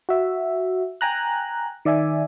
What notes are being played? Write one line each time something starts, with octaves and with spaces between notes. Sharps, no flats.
F#4 E5
G5 G#5 A#5 F#6
D#3 D5 E5 G#5